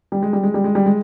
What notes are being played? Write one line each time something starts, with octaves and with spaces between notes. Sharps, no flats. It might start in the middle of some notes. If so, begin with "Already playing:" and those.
G3
G#3
G3
G#3
G3
G#3
G3
G#3